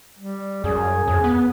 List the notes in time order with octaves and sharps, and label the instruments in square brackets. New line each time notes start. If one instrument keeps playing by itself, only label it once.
[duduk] G3
[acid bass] F#2 [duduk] G#4
[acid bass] F2
B3